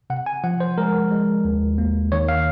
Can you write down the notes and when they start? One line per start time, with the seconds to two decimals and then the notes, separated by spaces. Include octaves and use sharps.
0.10 C3 F#5
0.26 G#5
0.44 F3 F#5
0.60 C5
0.78 G#3 A#4
1.11 G#3
1.45 D#2
1.78 A#3
2.12 D#3 C#5
2.29 F5